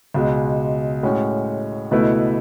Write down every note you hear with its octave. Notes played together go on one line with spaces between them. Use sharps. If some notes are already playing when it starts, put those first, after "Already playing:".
C#2 B2 G#3
A2 G#3 C#4 F#4
C#2 B2 A3 E4 B4